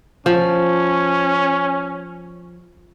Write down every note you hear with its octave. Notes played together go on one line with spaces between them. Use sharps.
F3 C#4